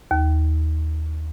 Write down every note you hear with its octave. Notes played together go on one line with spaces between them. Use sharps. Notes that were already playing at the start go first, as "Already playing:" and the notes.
D#2